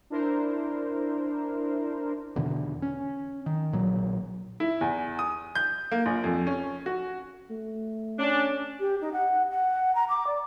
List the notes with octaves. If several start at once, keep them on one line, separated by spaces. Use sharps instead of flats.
D4 E4 A#4 C5
E2 B2 D3 E3
C#4
D#3
A#1 A#2 F#3
E4
E2
D#6
G6
A#3
A#1
F2
C#4
F#4
A3
C#4 D4
G4
D#4
F#5
F#5
A#5
D6
D5